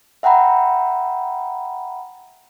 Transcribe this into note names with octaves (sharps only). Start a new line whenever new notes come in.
E5 F#5 G5 A#5 B5